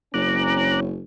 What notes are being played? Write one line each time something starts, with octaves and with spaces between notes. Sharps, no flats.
F#1 E2 C4 C#4 A#5 D6 F#6